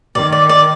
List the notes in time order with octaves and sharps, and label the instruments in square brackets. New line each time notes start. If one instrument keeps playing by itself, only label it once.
[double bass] D#3 [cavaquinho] D5
[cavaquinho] D5
D5